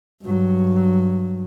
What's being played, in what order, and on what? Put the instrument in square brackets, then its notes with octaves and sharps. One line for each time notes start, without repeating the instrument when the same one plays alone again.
[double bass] G2 F#3